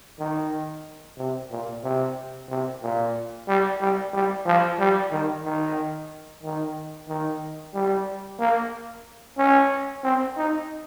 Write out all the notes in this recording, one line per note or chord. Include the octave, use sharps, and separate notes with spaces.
D#3
C3
A#2
C3
C3
A#2
G3
G3
G3
F3
G3
D#3
D#3
D#3
D#3
G3
A#3
C#4
C4
D#4